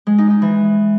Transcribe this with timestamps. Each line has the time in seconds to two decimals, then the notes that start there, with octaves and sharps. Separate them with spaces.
0.07 G#3
0.18 D#4
0.30 D#4
0.42 E3